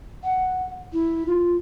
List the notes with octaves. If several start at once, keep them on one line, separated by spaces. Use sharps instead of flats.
F#5
E4
F4